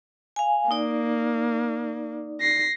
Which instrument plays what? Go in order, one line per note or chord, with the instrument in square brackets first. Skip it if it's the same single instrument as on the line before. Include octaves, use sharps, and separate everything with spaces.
[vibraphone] F5 G#5
[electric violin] A#3 [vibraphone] D#4 D5
[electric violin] A#6 C7